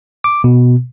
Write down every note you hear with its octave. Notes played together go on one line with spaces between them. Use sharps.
D6
B2